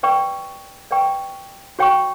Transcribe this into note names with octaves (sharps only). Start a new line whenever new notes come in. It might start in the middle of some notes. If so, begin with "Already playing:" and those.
B4 D5 G5 C#6
B4 D5 G5 C#6
F#4 C#5 G5 C#6